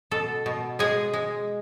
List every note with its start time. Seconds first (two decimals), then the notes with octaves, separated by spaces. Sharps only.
0.11 B2 A4
0.46 B2
0.79 G#3 G#4
1.13 G#3